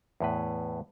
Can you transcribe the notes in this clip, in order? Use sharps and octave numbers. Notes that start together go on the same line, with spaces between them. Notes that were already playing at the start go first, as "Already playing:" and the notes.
E2 A2 B4